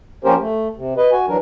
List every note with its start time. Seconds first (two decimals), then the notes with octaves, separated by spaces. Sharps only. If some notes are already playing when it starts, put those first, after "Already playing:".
0.24 F3 A#3 C#4 G4 A#4 C5
0.40 A3
0.76 C3
0.97 B4 D#5
1.12 F#4 G#5
1.28 E3 F#3 D4 A#4